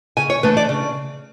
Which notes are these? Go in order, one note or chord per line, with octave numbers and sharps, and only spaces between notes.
C#3 G#5
C#5
E3 A3 D4 B4
D5
C#3